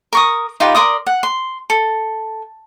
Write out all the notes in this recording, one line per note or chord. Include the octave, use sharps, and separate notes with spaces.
A#4 C#6 D#6
D#4 F4 G4 B4
A#4 D5 C6 D#6
F#5
C6
A4